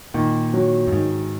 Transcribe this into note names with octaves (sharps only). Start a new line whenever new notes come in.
A#2 D#3
F#3
F#2
G#2 D#3